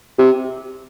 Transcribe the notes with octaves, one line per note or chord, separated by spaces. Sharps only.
C3